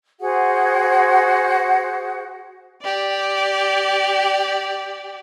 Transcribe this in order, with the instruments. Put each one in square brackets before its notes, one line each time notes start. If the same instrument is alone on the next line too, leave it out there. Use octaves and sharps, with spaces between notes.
[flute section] F#4 G#4 C5 F#5
[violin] G4 D5